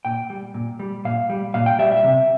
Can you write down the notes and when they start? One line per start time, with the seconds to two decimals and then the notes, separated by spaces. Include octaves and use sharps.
0.05 A#2 G5
0.30 G3
0.54 A#2
0.79 G3
1.05 A#2 F5
1.30 G3
1.54 A#2 F5
1.66 G5
1.79 G3 E5
1.92 E5
2.04 C3